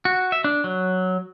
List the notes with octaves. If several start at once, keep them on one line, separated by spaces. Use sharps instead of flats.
F#4
E5
D4
F#3